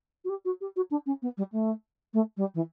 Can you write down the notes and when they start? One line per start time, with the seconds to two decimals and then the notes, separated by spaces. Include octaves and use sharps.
0.24 F#4
0.29 G4
0.45 F#4
0.60 G4
0.76 F#4
0.90 D4
1.06 C#4
1.22 B3
1.37 G3
1.52 A3
2.13 A3
2.36 G3
2.54 E3